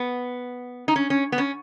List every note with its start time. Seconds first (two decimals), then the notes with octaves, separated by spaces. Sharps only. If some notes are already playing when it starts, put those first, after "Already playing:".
Already playing: B3
0.88 D#4
0.96 C#4
1.10 C#4
1.32 B3
1.38 C#4